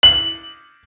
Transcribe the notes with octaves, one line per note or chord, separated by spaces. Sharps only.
F#7